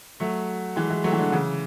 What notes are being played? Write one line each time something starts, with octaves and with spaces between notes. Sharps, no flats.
F#3 A3
E3 G#3
E3 G#3
F#3 A3
E3
D3 F#3
C#3 E3